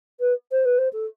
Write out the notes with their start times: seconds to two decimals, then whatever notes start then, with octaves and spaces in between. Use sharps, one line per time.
0.20 B4
0.51 C5
0.65 B4
0.78 C5
0.93 A4